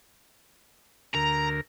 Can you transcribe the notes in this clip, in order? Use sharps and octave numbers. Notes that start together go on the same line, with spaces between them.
D2 A#4 A#5